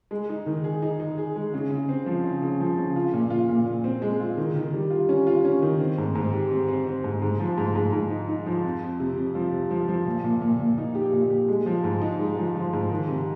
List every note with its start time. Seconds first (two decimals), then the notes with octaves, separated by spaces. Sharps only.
0.11 G#3
0.29 D#4
0.46 D#3
0.64 G#4
0.82 D#4
1.00 D#4
1.18 G#4
1.36 G#3
1.54 C#3
1.71 C#3
1.89 C4
2.06 F3
2.24 C#3
2.42 C#3
2.60 F3
2.78 C#3
2.96 F4
3.14 A#2
3.30 F4
3.49 A#2
3.66 A#2
3.84 C4
4.02 G#3
4.20 F4
4.37 D#3
4.56 D#3
4.74 G3
4.90 F4
5.09 C#4
5.27 F4
5.45 C#4
5.62 D#3
5.80 C4
5.98 G#2
6.15 G#2
6.33 G4
6.51 C4
6.68 C4
6.87 C4
7.04 G#2
7.22 G#2
7.40 F3
7.58 G#2
7.76 G#2
7.93 G#2
8.10 D#4
8.29 D#4
8.46 F3
8.64 F2
8.82 F2
9.00 C3
9.17 F2
9.35 F3
9.53 C3
9.71 F3
9.89 F3
10.06 A#2
10.24 A#2
10.42 A#2
10.60 A#2
10.78 D#4
10.95 G4
11.13 A#2
11.30 G4
11.48 G#3
11.66 F3
11.84 G#2
12.02 D#4
12.20 G#3
12.37 F3
12.55 F3
12.73 G#2
12.90 D#3
13.08 C3